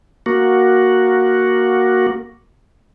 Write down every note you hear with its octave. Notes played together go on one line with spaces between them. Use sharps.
A#3 F#4